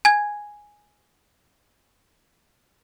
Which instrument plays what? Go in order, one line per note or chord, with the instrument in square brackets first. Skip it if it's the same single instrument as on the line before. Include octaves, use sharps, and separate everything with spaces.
[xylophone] G#5 G#6